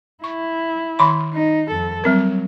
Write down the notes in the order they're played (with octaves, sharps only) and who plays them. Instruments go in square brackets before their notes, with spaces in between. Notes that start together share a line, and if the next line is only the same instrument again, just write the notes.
[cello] E4 [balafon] C#6
[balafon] D#3 B5 C6
[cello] D#4
F2 A4
[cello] F#3 [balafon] G3 C4 A#4